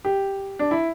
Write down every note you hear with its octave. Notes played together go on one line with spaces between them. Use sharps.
G4
D4
E4